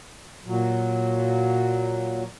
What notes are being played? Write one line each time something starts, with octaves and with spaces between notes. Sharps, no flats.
A#2 F#3